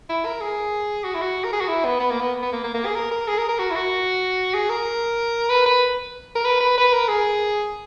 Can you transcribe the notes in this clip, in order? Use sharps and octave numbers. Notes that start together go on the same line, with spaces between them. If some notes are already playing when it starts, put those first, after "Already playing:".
E4
A#4
G#4
F#4
E4
F#4
A#4
G#4
F#4
E4
B3
B3
A#3
B3
B3
A#3
A#3
A#3
G#4
A#4
A#4
G#4
A#4
A#4
F#4
E4
F#4
G#4
A#4
B4
B4
A#4
B4
B4
B4
A#4
G#4